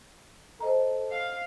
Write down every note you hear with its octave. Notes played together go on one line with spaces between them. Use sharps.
A4 C5 D#5 A#5
F5